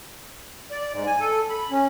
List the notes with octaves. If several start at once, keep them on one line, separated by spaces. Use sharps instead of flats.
D5
G#2
G#5
A4
B5
C#4